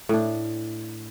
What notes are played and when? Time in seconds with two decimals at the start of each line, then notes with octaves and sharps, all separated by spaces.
0.09 A2 D4